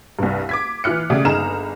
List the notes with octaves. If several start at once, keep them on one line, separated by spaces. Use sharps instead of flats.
C2 G2
D6 G#6 B6
E3 E4 F4 F6 F#6 C#7
C#3 A3 G4 D5 E5 D#6
G1 D#4 G#4 A#5 F6 E7